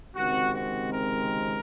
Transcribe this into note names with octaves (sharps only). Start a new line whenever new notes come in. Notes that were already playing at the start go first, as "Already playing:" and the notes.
C#2 C3 D#3 G#3 C4 F#4
F#4
A#4